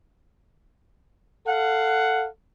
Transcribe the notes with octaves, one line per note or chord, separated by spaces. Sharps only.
A4 F5 F#5